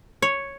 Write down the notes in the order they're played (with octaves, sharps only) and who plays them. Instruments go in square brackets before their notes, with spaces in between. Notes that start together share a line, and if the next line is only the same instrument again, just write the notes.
[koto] C#5